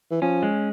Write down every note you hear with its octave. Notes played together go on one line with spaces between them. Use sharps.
E3
F3 C#4
G#3